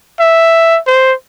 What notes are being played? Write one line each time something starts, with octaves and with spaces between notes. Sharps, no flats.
E5
C5